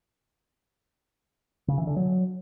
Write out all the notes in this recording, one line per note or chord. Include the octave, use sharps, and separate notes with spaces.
C#3
E3
D3
F#3